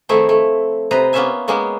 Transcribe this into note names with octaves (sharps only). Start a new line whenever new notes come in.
D#3 F3 A3 C4 E4 G#4
A3
C3 B4 C5 D#5 A#5
A#3 B3 C#4 F4 E5 G#5
G#3 A#3 B3 C#4